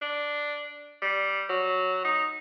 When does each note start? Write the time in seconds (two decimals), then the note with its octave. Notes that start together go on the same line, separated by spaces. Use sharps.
0.02 D4
1.02 G3
1.49 F#3
2.05 D#4